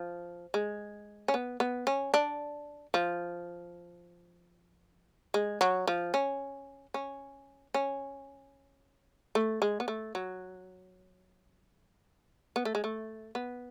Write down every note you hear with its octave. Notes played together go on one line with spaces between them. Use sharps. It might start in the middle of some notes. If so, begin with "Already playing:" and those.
Already playing: F3
G#3
C#4
B3
B3
C#4
D4
F3
G#3
F#3
F3
C#4
C#4
C#4
A3
G#3
B3
A3
F#3
B3
A3
G#3
A3
B3